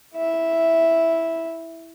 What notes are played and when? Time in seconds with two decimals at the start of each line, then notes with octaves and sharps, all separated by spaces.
0.16 E4 E5